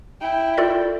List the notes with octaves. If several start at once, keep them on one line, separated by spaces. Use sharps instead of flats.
E4 G5
F4 A4 D5